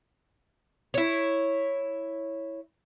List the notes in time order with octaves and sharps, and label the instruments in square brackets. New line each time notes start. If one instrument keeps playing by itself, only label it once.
[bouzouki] E4 C#5